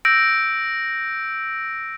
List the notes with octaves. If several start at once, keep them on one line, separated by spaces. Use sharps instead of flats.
E6 G6 A#6 D7